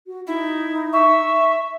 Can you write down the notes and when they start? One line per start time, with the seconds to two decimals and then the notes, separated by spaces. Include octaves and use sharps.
0.07 F#4
0.27 D#4 E4
0.93 E5 C#6